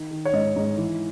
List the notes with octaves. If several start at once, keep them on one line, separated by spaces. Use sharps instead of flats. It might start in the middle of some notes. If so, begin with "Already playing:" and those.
Already playing: D#3
D#3
C#5
G#2 D#5
G#2
E3